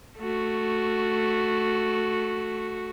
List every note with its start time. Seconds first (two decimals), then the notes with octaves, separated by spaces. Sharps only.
0.18 A3 F#4